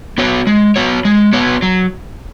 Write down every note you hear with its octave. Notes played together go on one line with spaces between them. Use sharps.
B3 F#4 C#5
G#3
B3 F#4 C#5
G#3
B3 F#4 C#5
F#3